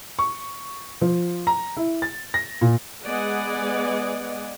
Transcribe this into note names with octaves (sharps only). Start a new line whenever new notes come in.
C#6
F3
A#5
E4
A6
A#6
A#2
G#3 B3 D5 D#5 F#5 G#5